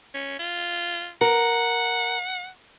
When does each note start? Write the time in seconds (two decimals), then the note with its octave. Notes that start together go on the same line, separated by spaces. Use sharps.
0.14 C#4
0.39 F4
1.21 A#4 F#5